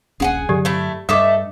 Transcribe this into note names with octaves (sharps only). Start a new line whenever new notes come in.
D#1 A#1 C#4 G#4 F#5 G#5
G2 D3 F#3 G4 A4 D5
A3 E4
G2 A3 A4 D#5 E5 D6 D#6